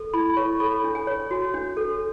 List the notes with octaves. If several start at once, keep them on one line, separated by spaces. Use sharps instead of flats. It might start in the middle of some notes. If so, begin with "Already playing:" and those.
Already playing: A4
E4 B5
C#5 C#6
A4 B5
D4
G#5
C#5
F#4
D4
A4